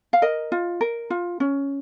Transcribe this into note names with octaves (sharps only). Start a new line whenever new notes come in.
F5
A#4 D#5
F4
A#4
F4
C#4